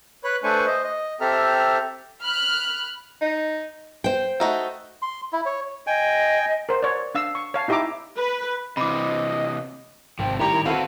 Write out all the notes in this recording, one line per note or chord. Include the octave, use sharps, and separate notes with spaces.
B4 C#5 B5 F#6
A3 D4 B4 C5 G#5 C#6
C5 D#5
D#5
C4 G4 A4 E5 A#5 F6
B5 F6 F#6
D#4
C5 G5
A3 D#4 F#4
C6
E4
C#5
D#5 G5 G#5
A#4 C5
C#5 D5
D4 F5 E6
C#6
C#5 F5 A5
D#4 E4 G4 E5 A#5 D6
B4
C3 E3 D#5 B5 D6
G#1 C3 F3 G5
A2 D#3 G3 E4 G4 C#5 A#5
D3 C4 F#4 A4 B4 F5